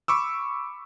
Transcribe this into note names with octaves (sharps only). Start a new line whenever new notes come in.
B5 C#6 D6 E6